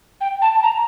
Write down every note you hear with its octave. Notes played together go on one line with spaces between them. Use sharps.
G5
A5
A#5